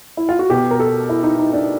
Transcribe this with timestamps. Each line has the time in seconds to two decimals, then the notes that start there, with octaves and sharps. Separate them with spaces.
0.17 E4
0.29 F4
0.39 F#4
0.50 B2 G4
0.71 A#4
0.80 A4
1.09 E4
1.23 D#4
1.39 D#4
1.53 D4